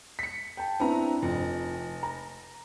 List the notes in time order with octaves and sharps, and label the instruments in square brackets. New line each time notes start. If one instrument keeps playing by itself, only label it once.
[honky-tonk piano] B6 C#7
[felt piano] G5 A5
[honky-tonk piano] B3 A#5 [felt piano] C4 D4 E4
[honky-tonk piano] F1 [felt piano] F2
[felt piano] A#5